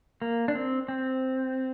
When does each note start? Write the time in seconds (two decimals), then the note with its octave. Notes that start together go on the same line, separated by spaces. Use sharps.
0.22 A#3
0.48 D4
0.55 C4
0.88 C4